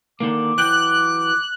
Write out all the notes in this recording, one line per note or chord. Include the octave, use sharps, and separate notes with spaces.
D3 D#3 A#3 D6
E3 F#3 G5 F#6